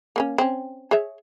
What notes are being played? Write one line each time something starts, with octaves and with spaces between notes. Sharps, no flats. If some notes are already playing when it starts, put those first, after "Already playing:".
A#3 B3 C#4
C4 C#4
G#4 C#5 E5